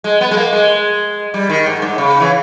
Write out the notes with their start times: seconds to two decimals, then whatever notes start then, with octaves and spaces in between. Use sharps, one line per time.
0.04 G#3
0.21 B3
0.31 G#3
0.37 A#3
0.53 G#3
1.34 G3
1.49 D#3
1.66 G#2
1.82 G#2
1.98 C#3
2.20 E3